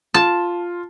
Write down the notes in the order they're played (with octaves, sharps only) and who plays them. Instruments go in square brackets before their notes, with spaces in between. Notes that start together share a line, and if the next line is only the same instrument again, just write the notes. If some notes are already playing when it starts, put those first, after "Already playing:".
[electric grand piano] F4 [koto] A5